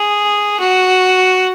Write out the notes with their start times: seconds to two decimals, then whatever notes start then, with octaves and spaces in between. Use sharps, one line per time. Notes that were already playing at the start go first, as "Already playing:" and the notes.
Already playing: G#4
0.60 F#4